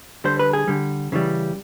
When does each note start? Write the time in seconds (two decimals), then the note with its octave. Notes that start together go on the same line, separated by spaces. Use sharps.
0.24 D3 G3 C5
0.39 B4
0.53 G#4
0.68 D3 G3
1.12 C#3 E3 G3